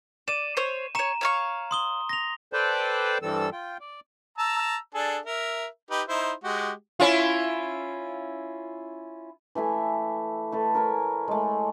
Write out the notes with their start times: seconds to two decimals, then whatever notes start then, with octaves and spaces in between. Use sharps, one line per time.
0.28 D5 D#7 E7
0.57 C5 C#5
0.95 C#5 A#5 C#6 E7
1.21 C#5 F5 C#6
1.71 C6 D#6 G7
2.09 A#6 F7
2.53 A4 B4 C5 D5 G5 A5
3.22 G2 E3 G3 C4 A4 E6
3.52 F4 G5
3.80 D5
4.38 A5 A#5 E6
4.94 D4 G#4 A4
5.26 A#4 E5
5.90 D#4 G4 B4
6.08 D#4 E4 C5
6.44 G#3 F#4 G4
7.00 C#4 E4 F4
9.55 E3 A3 E5 G#5
10.52 A3 A4 B4
10.75 A#4 C#5 G#5
11.28 G#3 A3